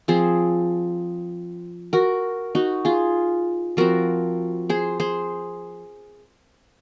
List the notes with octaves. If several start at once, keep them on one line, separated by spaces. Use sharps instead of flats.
F3 C4 G#4 C5
F#4 A#4
D#4 F#4
F4 G#4
F3 C4 F#4 A#4
G#4 C5
G#4 C5